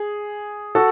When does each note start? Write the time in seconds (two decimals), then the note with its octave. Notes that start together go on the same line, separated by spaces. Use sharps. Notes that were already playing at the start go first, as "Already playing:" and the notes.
Already playing: G#4
0.75 F#4 A4